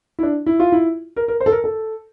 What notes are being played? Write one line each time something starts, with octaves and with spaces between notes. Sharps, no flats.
E4
D4
E4
F4
E4
A#4
A#4
C5
A4
A#4
A4